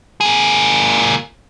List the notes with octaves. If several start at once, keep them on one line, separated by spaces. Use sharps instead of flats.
A#3 G#4